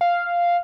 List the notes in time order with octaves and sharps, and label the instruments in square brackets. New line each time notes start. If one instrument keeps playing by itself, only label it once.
[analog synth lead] F5